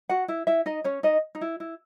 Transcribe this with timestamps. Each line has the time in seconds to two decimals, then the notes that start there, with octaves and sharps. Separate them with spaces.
0.09 F#4 F#5
0.28 E4 E5
0.47 E4 E5
0.66 D#4 D#5
0.84 C#4 C#5
1.03 D#4 D#5
1.35 D#4
1.41 E4
1.60 E4